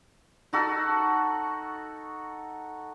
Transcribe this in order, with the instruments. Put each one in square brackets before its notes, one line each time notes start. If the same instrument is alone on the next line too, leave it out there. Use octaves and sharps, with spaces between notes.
[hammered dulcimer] D#4 F#4 A4